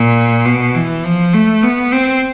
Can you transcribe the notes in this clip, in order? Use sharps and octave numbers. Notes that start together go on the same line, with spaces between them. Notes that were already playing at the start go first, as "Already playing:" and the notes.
Already playing: A#2
B2
E3
F3
A3
B3
C4